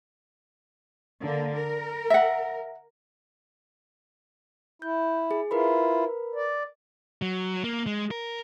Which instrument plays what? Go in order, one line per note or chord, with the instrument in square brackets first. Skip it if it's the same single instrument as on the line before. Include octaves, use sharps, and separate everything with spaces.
[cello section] D3 A#3
A#4
[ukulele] E5 F#5
[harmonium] E4 [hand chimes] G6
[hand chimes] G#4
[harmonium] E4 F4 [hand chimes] A#4 B4 B5
[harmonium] D5
[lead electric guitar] F#3
A#3
G#3
A#4